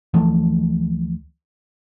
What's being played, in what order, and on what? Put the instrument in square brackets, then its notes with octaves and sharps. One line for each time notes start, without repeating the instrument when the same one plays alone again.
[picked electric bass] D2 E3 F3 A3